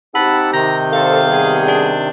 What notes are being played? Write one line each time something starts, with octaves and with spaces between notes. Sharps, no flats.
C4 D#4 G4 F#5 A5 B5 E6
C3 D#3 A#5 G6
D4 A4 C5 F5
G3 B3 G#4
D4